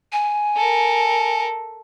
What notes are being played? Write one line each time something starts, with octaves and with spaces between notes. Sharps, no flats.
G#5
A4 A#4